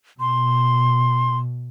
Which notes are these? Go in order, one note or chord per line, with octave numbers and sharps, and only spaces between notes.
B2 C6